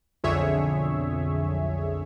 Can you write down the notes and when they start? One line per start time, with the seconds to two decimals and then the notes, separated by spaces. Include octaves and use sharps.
0.24 B1 F2 D3 G#4 C#5 E5